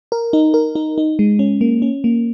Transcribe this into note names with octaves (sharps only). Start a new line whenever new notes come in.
A#4
D#4
A#4
D#4
D#4
G#3
C#4
A#3
C#4
A#3